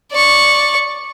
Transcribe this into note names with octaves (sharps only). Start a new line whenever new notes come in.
D5 C#6